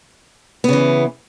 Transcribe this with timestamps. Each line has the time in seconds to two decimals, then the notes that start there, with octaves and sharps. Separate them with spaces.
0.64 B3
0.69 C#3
0.73 E3